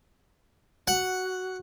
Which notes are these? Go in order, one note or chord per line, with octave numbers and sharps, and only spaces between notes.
F#4 F#5